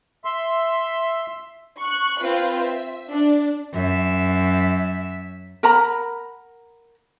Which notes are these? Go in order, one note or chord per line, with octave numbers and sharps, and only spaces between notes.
E5 C6
C#6 F#6
C4 F4 B4
E5
D4
F#2 E5
A#4 F#5 A#5 B5